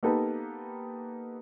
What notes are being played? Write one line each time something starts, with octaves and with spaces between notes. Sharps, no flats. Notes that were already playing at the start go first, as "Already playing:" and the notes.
A#3 B3 D#4 G4 A4 B4